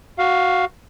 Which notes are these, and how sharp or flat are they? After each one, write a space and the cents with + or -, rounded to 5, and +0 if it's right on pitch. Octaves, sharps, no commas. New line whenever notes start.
F#4 +0 F5 +10